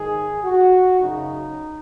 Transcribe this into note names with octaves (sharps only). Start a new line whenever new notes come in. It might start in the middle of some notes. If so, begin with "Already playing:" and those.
Already playing: G#2 D#3 G#4
F#4
F#2 C#3 D#4